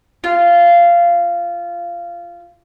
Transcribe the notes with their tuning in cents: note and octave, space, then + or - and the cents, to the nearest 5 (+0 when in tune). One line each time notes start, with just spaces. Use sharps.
F4 -15